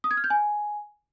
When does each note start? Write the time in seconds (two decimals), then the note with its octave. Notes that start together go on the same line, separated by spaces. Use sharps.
0.04 D#6
0.11 G#6
0.17 F6
0.24 G6
0.30 G#5